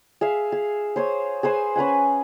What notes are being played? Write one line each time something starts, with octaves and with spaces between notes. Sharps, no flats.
G#4 E5 F5
G#4
C5 C#5 D#6
G#4 B4 C5 G#5
C#4 B4 F#5 G#5